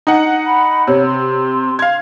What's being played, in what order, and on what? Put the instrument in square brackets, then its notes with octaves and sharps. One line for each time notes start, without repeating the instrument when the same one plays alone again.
[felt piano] D#4 F#5
[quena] B5
[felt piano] C3 [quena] C#5
[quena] C6
[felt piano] F5 G#6